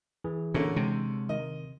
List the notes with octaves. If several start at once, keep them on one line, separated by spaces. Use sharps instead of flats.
E3 G#4
A#2 D3 C#4 A4
C3 G#3
D#3 D#5